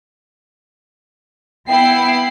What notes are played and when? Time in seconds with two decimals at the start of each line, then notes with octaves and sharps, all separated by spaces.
1.68 B3 E4 G5 C7